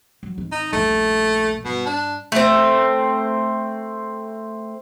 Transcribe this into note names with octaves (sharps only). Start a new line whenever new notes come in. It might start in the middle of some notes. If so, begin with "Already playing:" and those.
F#3
G#1 D#3
D#4
D#1 A#1 A3
G2 B2
D4
A3 C4